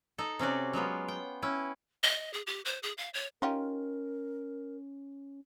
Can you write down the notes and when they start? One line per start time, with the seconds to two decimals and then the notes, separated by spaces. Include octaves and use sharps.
0.18 D#4 A4
0.39 C3 C#4 F#4 D5
0.73 F#3 G#3 B3 F4
1.08 G5
1.42 C#4 E4 B4
2.03 D#5
2.34 G#4
2.47 G4
2.65 C5
2.83 G#4
2.98 F5
3.14 C#5
3.42 C#4 D#4 F4 G4 A#4